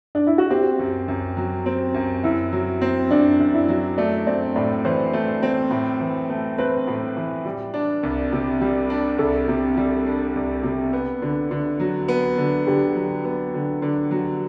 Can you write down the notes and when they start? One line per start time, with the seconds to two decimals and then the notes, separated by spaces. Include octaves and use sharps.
0.15 D4
0.27 E4
0.38 F#4
0.50 C4 G4
0.79 F#2
1.08 F#2
1.37 F#3
1.66 C4
1.94 F#2
2.23 F#2 E4
2.52 F#3
2.81 C4
3.11 F#2 D4
3.39 F#2
3.54 E4
3.68 F#3
3.97 A3 D5
4.27 C4 D5
4.55 A2 D5
4.85 E3 C5
5.13 A3
5.43 C4
5.71 A2
6.00 E3
6.30 A3
6.58 C4 B4
6.87 A2
7.17 E3
7.45 G3
7.74 D4
8.03 C2
8.32 C3
8.61 G3
8.90 D4
9.18 C2 A4
9.48 C3
9.77 G3
10.06 D4
10.36 C2
10.63 C3
10.93 B3
11.22 D3
11.51 D3
11.80 F#3
12.08 B3
12.37 D3
12.67 D3 G4
12.96 F#3
13.25 B3
13.54 D3
13.82 D3
14.11 F#3